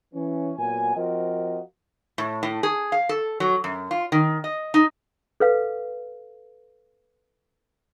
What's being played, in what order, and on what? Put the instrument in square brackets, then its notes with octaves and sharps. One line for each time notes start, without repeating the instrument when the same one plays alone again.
[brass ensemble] E3 C#4
A#2 F#3 B3 G#5
F3 C4 F4 F#4 A#4 D#5
[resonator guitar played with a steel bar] A2
A2
G#4
F5
A4
F#3
F#2
F4
D#3
D#5
D#4
[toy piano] A4 B4 F5